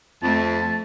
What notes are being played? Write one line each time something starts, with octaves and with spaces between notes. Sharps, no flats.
F2 A3 A5